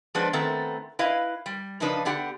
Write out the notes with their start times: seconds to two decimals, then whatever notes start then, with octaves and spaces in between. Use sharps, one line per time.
0.15 F3 G#3 B3 D4 B4
0.33 D#3 A3 B3 C4 A4
0.99 E4 B4 D#5 F5
1.46 G3
1.80 C#3 F3 D4 D#4 B4
2.05 D3 B3 G4 F#5